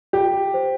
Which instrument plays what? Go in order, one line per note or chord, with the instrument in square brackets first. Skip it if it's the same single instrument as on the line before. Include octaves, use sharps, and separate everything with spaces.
[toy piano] F4 [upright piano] G4
[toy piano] C5